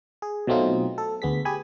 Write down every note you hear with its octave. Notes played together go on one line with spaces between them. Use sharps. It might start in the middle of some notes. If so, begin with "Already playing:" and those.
G#4
B2 F#3 A3 C4 D#4 F4
A4
D2 B3 G#4 B6
G4 G#4 G#5 B5